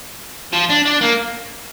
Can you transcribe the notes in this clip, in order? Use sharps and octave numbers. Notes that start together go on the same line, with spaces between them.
F3
D4
D4
A#3